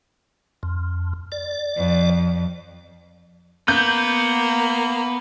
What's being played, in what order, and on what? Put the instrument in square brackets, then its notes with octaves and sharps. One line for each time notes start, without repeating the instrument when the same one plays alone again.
[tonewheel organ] F2
D5
[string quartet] F2
[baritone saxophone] A#3 [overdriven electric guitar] B3 [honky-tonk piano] G6